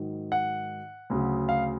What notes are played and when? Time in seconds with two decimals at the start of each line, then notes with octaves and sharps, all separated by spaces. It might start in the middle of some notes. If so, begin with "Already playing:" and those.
Already playing: G#2 D#3 F#3
0.32 F#5
1.10 D2 C#3 F#3
1.49 F5